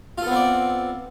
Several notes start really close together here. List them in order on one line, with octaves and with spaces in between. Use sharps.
F4 A4 B3 C4 D5